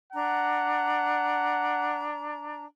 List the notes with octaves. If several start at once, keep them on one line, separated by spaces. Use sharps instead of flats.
D4 F#5 A#5